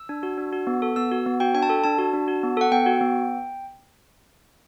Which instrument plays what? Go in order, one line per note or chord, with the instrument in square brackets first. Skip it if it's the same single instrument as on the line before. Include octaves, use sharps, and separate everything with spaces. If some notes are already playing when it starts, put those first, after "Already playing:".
Already playing: [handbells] E6
D4
F#4
D4
F#4
B3
A4
B3 E6
F#4
B3
F#4 G5
D4 G5
A5
A4
D4 A5
F#4
D4
F#4
B3
A4 F#5
B3 G5
F#4
B3